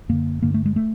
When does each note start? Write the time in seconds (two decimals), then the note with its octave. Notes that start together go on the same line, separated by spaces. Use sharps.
0.09 F#2 D3 A#3
0.43 G2 D3 A#3
0.54 A3
0.66 G#3
0.76 A3